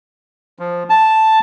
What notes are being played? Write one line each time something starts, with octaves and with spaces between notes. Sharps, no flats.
F3
A5